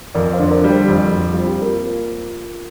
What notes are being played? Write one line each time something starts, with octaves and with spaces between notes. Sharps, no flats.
F2 A#4 D5
C5 F5
D3
C5
A#4 D5
G3 D5
G4 C5
F2
G3
C4 F4
G4
A#3 F4 A#4